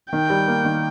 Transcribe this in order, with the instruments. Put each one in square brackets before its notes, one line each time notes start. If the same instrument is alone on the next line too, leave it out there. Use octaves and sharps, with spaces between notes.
[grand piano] D#3 [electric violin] G5
[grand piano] G3
A#3
D#3